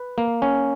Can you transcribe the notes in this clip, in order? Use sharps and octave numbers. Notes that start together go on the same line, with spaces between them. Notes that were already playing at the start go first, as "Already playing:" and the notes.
Already playing: B4
A#3
C#4